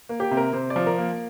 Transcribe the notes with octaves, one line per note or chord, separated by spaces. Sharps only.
A#3
G4
C3
A#4
C3 C5
D5
F3
A#4
A#3